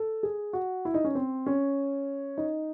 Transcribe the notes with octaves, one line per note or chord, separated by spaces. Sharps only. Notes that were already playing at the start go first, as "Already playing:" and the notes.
Already playing: A4
G#4
F#4
E4
D#4
C#4
C4
C#4
D#4